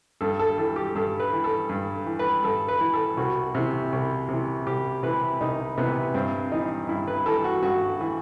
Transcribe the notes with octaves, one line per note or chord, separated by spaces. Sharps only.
G2 A4
A4
E3 A4
G4
G2 A4
B4
E3
A4
G2
E3
B4
G2 A4
B4
E3
A4
C2 F#4
C3 E3
C2
C3 E3
C2 G4
C3 E3 B4
C2 D#4
C3 E3 B3
G2 C4
E3 D#4
G2 E4
B4
E3 A4
F#4
G2 F#4
E3